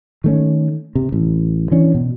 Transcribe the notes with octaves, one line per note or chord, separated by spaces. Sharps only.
D#3 A3 C#4
C3
A1
E3 C#4 D4
B2